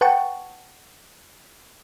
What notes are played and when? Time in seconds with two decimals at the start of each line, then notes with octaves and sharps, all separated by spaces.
0.01 B4 F#5 G5 A5 C#6